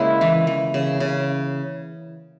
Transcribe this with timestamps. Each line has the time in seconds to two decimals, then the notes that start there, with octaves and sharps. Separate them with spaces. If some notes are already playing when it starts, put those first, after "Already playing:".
Already playing: C#3 G#3 A#3 E4
0.21 E3
0.47 E3
0.74 C#3
1.00 C#3